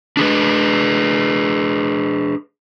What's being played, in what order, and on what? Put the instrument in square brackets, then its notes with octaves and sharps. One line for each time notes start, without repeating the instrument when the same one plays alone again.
[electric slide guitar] D4 G#4 B4